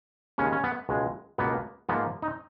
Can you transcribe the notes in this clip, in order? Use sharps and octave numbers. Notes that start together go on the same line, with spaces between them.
D#2 C#3 G#3 C#4
C#4
B3
C#2 B2 G#3
C#2 B2 A#3 B3
G#2 F3 A#3 B3
D#4